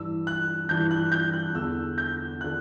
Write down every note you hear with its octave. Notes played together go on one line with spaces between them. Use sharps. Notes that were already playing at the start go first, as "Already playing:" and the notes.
Already playing: G2 E3 E6
F#6
G2 E3 G6
F#6
G6
F#6
E2 D3 E6
G6
D3 F#6